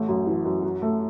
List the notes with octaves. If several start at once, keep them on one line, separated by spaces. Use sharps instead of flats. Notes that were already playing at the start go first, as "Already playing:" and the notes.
Already playing: A1 A3
F#2
E3
F#2
F#3
A3